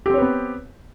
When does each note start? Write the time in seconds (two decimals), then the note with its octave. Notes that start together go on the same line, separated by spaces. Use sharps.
0.06 G4
0.10 C4
0.14 C#5
0.18 B4
0.22 B3